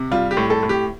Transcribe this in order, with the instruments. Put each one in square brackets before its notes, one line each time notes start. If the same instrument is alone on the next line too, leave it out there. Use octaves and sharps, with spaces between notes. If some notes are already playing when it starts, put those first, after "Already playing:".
Already playing: [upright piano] C3
G3 F4
G4
A2
A4
A2
G4